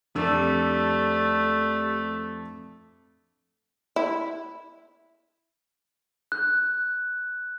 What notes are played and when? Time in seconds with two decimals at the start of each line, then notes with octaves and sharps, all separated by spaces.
0.15 F2 G3 A3 D4 D5 E6
3.96 E4
6.32 F#6